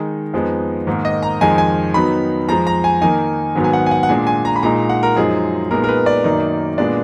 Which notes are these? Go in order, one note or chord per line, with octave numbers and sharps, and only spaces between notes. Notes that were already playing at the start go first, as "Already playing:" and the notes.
Already playing: D#3 G#3 D#4
F2 F3 G#3 B3 D#4
G#2 D#3 A#3
D#5
A#5
F2 D#3 G#3 D#4 G#5
G#5
D#3 F#3 B3 D#4 B5
F2 F3 G#3 A#5
A#5
G#5
D#3 A#3 D#4 G#5
G#2 D#3 F#3 B3
G#5
F#5
G#5
F#5
F#5
A#2 G#3 D4 G#5
G#5
A#5
B5
A#2 G#3 D#4 A#5
F#5
A#4
F#2 F3 G#3 D#4 G#4
A#2 G#3 B3 D#4 A#4
A#4
B4
D5
F#2 D#3 A#3 D#4
A#2 G#3 B3 D4 D5